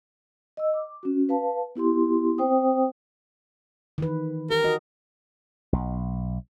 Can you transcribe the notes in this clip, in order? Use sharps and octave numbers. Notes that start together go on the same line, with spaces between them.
D#5 E6
D6
C#4 F#4
B4 F5 A5
B3 E4 G4 C6
C4 C5 G5 D#6
D#3 E3 B4
G4 A#4
F#4 D#5
B1